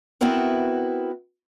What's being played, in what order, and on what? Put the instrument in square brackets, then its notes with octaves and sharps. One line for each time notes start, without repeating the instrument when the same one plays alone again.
[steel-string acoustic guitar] B3 C4 E4 F#4 A#4 B4